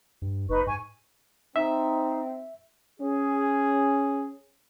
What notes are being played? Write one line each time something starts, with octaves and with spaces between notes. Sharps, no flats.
G2
F#1 D#4 B4 C#6
G#2 G#5 C#6
C4 D#4 E5
C#4 G#4